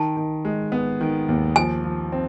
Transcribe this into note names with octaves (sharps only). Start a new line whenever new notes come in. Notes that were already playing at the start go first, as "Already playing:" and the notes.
Already playing: D#3 A5
D#3
G#3
B3
D#3
D#2
F3 G#5
F3
C4